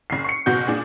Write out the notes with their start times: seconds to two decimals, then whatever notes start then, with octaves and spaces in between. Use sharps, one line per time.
0.10 F#1 C7
0.24 C#6 C7 C#7
0.46 F#1 B2 F#4 G6
0.68 A#2 D4 G#4